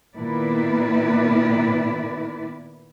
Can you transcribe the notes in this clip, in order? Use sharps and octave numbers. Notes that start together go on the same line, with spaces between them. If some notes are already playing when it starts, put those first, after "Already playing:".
A#2 D#3 B3 E4 B4 D5